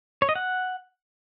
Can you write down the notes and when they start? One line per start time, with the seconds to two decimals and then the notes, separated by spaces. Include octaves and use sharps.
0.22 C#5
0.29 D#5
0.35 F#5